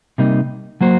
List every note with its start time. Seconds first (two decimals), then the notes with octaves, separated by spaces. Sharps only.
0.18 C3 G3 A#3 D#4
0.81 F#3 A#3 F#4 C5